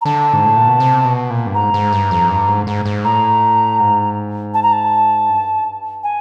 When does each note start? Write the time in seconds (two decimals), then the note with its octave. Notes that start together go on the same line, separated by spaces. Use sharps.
0.01 A#5
0.05 D3 A5
0.33 G#2
0.45 A2
0.57 A#2
0.68 B2
0.80 C3
1.05 B2
1.30 A#2
1.46 G2
1.55 G#2 A#5
1.74 G#2
1.92 G2
2.11 F2
2.30 G2
2.48 G#2
2.67 G#2
2.86 G#2
3.04 A2 A#5
3.80 G#2
4.54 A5
4.63 A#5
4.72 A5
5.29 G2
6.03 G#5